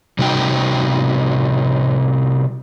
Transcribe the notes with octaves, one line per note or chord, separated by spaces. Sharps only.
C3 G3 D#4 F#4 G5